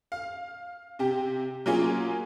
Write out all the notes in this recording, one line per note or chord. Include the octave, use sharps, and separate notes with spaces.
F5
C3 G4
F#3 A#3 C#4 F4 G#4